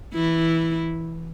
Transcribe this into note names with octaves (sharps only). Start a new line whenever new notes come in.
E3 E4